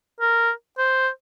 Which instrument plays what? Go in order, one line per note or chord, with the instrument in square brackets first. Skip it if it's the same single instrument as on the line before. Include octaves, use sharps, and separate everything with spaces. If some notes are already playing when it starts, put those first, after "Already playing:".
[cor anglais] A#4
C5